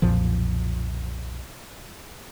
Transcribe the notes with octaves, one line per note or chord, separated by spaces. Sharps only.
B1 F2 A#2 F3